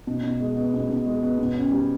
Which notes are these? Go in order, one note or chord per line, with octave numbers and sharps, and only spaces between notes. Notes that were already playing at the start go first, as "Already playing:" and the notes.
B2
B2
G#3
B3
B2
B2
G#3
B3
B2
C#4
G3